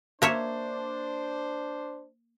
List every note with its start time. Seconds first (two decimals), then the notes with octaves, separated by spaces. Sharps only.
0.22 A#3 D4 C5 C#5 E5